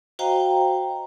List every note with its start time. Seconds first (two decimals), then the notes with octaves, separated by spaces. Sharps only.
0.19 F#4 C5 D#5 F5 G5 A#5